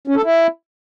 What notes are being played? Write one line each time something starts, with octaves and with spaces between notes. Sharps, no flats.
C#4
A4
E4